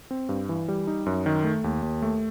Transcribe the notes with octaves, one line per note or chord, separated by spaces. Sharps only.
C4
G2
E3
G3
D#4
F#2
D#3
A3
D#2
D#2
A3